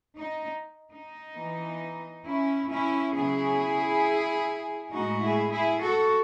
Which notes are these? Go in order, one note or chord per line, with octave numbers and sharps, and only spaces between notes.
D#4
D#4
E3 B3
C#4 E4
C#4 E4
C#3 F#3 B3 E4 G#4
A2 G#3 B3 D#4 F#4
E4 G#4
E4 G#4
F#4 A4